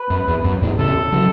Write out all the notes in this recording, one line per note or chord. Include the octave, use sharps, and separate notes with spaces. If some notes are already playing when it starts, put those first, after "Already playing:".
Already playing: B4
F#2
E2
F#2
E2 A2
A2 C#3 A4
C#3 F#3